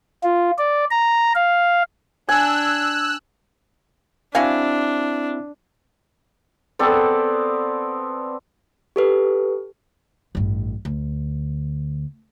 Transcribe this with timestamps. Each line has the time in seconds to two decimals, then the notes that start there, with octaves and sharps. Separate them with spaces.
0.24 F4
0.58 D5
0.91 A#5
1.35 F5
2.29 D4 G#5 E6 F#6
4.35 C4 D4 E4 F#4 E5 F5 G#5
6.79 B3 C4 A4 D5
8.96 G4 A4 B4
10.35 A1 G2
10.85 D2